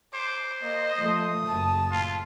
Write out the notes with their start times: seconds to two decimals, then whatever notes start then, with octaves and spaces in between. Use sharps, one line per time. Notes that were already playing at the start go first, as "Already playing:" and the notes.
0.14 C5 D6
0.62 A#3 D#5
0.98 F3 A3 D#6
1.47 F#1 A5
1.91 A2 F4